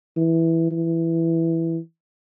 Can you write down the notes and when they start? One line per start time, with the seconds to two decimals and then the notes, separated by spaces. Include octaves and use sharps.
0.17 E3
0.71 E3